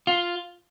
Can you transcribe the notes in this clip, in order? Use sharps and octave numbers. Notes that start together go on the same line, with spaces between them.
F4